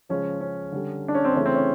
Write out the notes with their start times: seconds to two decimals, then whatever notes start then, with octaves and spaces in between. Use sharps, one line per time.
0.09 C#3 F3 G#3 C#4
0.41 C#4
0.72 D3 G3
1.08 D4
1.14 C#4
1.25 C4
1.35 C#3 E3 A3 C#4
1.46 C4
1.56 C#4